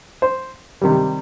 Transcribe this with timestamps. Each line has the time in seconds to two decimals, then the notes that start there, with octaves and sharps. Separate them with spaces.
0.22 C5
0.81 C3 D#3 G3